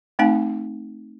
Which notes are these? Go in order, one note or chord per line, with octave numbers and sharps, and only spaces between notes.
A3 C4 D#4 F5 G#5